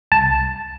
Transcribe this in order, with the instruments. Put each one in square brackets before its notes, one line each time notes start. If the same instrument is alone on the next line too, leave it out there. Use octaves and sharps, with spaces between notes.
[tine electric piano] C2 A5